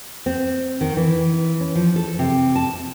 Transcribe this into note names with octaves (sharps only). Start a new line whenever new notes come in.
C4
D#3
E3
C#4
F3
A4
C3
A5